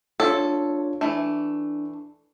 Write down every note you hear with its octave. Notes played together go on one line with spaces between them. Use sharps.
D4 F4 A4 C#5
E3 A3 D4